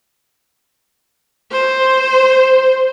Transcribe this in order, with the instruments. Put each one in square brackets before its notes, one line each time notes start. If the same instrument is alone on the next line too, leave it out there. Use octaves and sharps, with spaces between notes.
[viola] C5